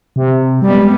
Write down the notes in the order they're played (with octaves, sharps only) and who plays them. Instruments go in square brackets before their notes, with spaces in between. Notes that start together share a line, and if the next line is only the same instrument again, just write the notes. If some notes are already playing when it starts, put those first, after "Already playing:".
[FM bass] C3
[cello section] F#2 G#3 B3 [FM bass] G3